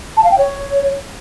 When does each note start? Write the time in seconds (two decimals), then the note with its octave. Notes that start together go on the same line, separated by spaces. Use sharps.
0.17 A5
0.24 F5
0.31 G5
0.38 C#5